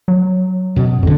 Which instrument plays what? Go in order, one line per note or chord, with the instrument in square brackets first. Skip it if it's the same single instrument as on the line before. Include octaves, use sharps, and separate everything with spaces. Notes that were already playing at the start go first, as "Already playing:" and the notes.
[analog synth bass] F#3
[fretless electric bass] F#2 B2
[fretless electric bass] A1 A#2 D3 [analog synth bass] F2